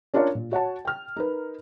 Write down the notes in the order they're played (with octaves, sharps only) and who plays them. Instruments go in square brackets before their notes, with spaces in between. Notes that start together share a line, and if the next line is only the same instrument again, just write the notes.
[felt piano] C#4 D4 F4 A#4 C#5 D5
A#2
F#4 C#5 F#5 A5
G5 F6
D#4 A#4 B4